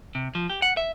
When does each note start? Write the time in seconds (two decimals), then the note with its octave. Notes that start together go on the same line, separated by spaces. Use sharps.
0.15 C3
0.35 F3
0.50 G4
0.62 F#5
0.77 E5